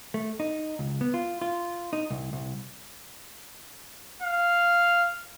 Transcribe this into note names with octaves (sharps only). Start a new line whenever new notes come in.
A3
D#4
C#2
B3
F4
F4
D#4
C2
C2
F5